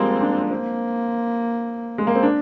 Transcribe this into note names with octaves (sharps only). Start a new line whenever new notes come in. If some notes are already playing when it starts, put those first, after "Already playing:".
Already playing: F3 G3 G#3 A#3 C4
D4
A#3 C4
G#3
A#3
C4
D4